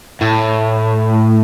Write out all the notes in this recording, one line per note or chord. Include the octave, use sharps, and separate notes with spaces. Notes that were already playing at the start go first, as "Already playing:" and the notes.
A2